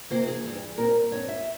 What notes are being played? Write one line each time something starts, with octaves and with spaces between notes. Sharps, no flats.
C3 E3 A#3 C5
G#4
G2 E3 G3
A#2 G3 C4 A#4
G2 G3 C4 C#5
E5